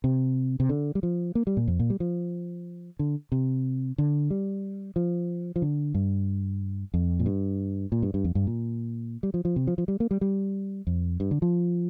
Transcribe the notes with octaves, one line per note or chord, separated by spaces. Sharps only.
C3
C3
D3
G3
F3
A#3
G3
A#2
F2
A#2
G3
F3
D3
C3
D3
G3
F3
F3
D3
G2
F2
A#2
G2
A#2
G2
G2
F2
G2
A#2
G3
F3
F3
C3
F3
F3
G3
A#3
G3
G3
F2
G2
D3
F3